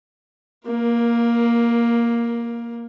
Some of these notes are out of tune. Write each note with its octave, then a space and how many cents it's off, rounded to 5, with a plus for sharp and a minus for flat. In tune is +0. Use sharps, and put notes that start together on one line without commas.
A#3 +5 A#4 +25